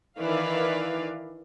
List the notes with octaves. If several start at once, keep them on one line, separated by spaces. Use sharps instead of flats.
D#3 E3 E4 B4 D5 F5